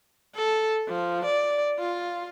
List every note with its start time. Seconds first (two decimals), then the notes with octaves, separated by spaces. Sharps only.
0.35 A4
0.88 F3
1.25 D5
1.79 F4